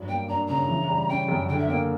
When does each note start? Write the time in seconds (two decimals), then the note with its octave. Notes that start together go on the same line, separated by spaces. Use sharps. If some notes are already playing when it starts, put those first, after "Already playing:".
Already playing: G2 F#3
0.09 A#3 G5
0.28 D4 A#5
0.48 C#3 A#5
0.68 E3
0.88 G3
1.08 C#4 G5
1.28 F#2
1.49 D3 G5
1.58 E5
1.68 A#3 G5